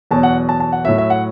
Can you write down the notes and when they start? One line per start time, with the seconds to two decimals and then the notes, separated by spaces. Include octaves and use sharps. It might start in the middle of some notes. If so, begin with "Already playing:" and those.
0.11 E2 B2 F#3 A5
0.23 F#5
0.49 A5
0.60 A5
0.72 F#5
0.85 A2 F#3 E5
0.98 E5
1.10 F#5